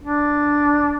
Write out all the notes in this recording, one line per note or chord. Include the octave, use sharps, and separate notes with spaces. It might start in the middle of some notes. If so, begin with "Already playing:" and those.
D4